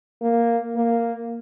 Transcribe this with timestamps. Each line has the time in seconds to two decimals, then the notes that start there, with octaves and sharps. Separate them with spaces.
0.22 A#3
0.76 A#3